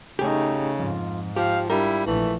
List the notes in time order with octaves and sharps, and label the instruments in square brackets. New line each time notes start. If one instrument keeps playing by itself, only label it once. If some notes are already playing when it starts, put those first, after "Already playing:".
[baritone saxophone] C#3 [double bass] A3 D#4 [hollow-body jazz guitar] G4 G#4
[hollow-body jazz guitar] F2 [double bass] G#2 [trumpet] F4
[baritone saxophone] F3 [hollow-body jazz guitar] G4 [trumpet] F5
[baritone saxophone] G3 [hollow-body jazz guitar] D4 F4 A#4 [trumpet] E4
[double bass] A#1 [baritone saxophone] E3 [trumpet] A3